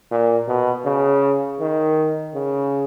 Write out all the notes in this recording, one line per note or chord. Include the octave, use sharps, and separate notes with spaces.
A#2
B2
C#3
D#3
C#3